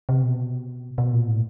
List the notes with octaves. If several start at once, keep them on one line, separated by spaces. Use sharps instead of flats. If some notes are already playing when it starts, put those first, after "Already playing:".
C3
B2
B2
A#2
A2